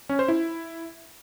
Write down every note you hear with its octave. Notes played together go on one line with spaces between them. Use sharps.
C#4
C5
E4